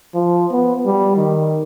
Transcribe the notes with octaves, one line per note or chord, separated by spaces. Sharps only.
F3
B3
G3
D#3